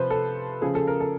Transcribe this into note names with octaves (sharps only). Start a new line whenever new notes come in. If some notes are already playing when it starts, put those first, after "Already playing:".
Already playing: C3 F3 B4 C5
A4
C#3 F3 G#4
A4
A#4
A4